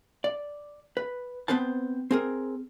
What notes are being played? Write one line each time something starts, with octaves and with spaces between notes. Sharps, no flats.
D5
B4
B3 C4 B4 C5 A5
C4 G#4 A#4